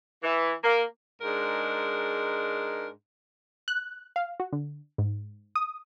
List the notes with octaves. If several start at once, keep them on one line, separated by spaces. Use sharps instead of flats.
E3
A#3
G#2 G#3 D4 A#4
F#6
F5
F#4
D3
G#2
D#6